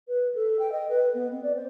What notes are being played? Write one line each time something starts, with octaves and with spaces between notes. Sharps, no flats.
B4
A4
G5
D#5
B4
B3
C4
D5
C5